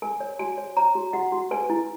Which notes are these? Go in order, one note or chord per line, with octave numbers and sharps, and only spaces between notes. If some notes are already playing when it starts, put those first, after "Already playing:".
A#4 G#5
C#5
F#4 G#5
C#5
C#5 A#5
F#4
F#4 F#5
F#4
B4 G#5
E4